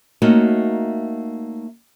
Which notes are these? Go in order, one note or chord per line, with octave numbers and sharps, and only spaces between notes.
A3 A#3 C#4 D#4 F#4